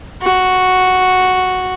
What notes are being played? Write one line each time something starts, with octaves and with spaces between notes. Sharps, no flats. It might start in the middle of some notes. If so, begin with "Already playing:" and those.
F#4